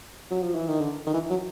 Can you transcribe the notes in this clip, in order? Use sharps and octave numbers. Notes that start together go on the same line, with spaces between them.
F#3
F3
E3
D#3
D3
D#3
E3
F#3